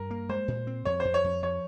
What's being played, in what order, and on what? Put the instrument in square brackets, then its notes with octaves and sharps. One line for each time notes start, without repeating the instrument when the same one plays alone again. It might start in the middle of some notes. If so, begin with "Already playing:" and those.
Already playing: [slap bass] G2 [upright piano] A#4
[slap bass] A#3
[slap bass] G#3 [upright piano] C5
[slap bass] A#2
C4
[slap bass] F2 [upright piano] C#5
[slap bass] F2 [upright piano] C5
[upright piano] C#5
[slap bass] F2
[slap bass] F3 [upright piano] C#5